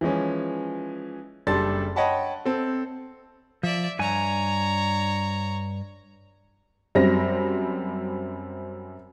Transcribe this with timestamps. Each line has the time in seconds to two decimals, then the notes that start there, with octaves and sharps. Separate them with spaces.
0.01 E3 F3 G#3 C#4
1.47 F#1 G3 D4 A4 C6 A6
1.96 C#5 D#5 F#5 G5 A5 B5
2.45 C4 A4
3.63 F3 D5 E5
3.99 G2 C#5 G#5 A#5
6.95 F#2 G3 C4 A#6